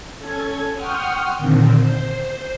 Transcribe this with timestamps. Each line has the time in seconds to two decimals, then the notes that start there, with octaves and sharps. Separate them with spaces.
0.18 C#4 A4 G#6
0.74 F#5 G5 C6 C#6 D#6 F6
1.37 A#2 D3 D#3 C4
1.78 C5